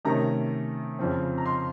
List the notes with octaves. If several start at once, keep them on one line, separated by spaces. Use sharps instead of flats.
C3 D#3 A3 C#4 A#5
F2 C#3 F3 C4
A#5
C6